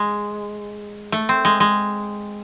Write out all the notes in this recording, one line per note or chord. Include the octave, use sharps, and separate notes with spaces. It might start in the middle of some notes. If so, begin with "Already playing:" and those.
Already playing: G#3
A3
C4
G#3
G#3